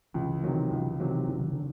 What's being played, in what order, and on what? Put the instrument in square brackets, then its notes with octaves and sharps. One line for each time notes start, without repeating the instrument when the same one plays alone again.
[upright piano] C#2 [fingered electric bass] E3
[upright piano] C3 D#3 F#3
[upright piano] C#2 [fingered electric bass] E3
[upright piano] C3 D#3 F#3 [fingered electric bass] E3
[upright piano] F#1 [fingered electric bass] E3
[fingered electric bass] D#3
D3